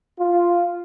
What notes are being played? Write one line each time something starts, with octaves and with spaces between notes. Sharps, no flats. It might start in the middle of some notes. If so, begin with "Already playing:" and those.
F4